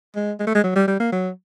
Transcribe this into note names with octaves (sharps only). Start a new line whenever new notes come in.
G#3
G#3
A3
G#3
F#3
G3
G3
A#3
F#3